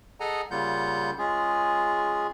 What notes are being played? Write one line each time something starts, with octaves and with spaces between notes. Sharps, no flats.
G#4 A4 D#5 F#5 G#5 A#5
C#3 G3 A#3 F4 F#5 G6
G#3 C#4 F4 G#4